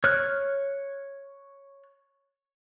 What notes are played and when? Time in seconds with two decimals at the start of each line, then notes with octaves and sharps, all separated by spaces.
0.04 C#5 F6 F#6